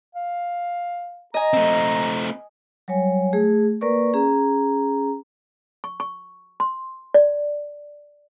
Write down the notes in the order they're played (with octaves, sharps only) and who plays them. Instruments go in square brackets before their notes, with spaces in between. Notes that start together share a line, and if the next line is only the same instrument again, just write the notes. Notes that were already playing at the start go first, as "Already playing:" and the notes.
[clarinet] F5
[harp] D#5 G#5 [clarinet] A#5
[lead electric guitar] A3 C4
[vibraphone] F#3 G3 C#5 G#5
A3 G#4
A#3 A#4 B4 D5 C#6
C#4 G#4 A#5
[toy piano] C#6
C#6
C6
D5